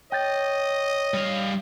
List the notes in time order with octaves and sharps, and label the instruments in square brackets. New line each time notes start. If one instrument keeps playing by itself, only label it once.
[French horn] C#5 [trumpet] D#5 [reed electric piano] G5 G6 A6
[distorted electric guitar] G3 F5